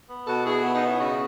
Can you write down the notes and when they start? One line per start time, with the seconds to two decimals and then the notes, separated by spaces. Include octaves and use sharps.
0.08 B3
0.26 B2 F#4 A4
0.44 B2 E4 G#4
0.63 B3 E4
0.74 D#4
0.81 B2 C#4 E4
0.99 C#3 D#4 F#4